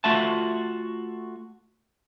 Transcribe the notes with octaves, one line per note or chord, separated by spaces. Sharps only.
A3 F4 F#4 E5 A5